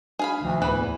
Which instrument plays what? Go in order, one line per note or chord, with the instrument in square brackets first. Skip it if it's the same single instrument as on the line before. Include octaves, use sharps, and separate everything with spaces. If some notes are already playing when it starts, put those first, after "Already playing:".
[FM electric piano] D4 F#4 [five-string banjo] G#4 F5 B5
[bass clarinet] D2 [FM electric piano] C3 D#3 F3
[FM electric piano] A2 B3 [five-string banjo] E3 [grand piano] B4 F#6
[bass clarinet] E2